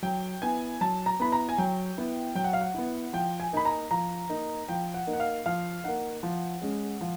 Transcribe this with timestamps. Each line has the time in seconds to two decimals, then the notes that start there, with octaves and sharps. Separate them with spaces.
0.02 F#3 G5
0.42 B3 E4 G#5
0.81 F#3 A5
1.06 A#5
1.20 B3 E4 B5
1.32 A#5
1.49 G#5
1.58 F#3 G5
1.97 B3 E4
2.35 F#3 G5
2.44 F#5
2.53 F5
2.61 F#5
2.74 B3 E4
3.13 F3 G5
3.40 G#5
3.52 A#3 D#4 B5
3.65 A#5
3.91 F3 A#5
4.29 A#3 D#4
4.69 F3 G5
4.94 F#5
5.07 A#3 D#4
5.13 F#5
5.20 F5
5.46 F3 F5
5.84 A#3 D#4 F#5
6.23 F3
6.62 G#3 C#4
7.01 F3